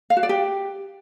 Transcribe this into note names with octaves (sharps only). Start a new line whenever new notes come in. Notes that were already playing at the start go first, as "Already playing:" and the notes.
F5
F#4
D5
G4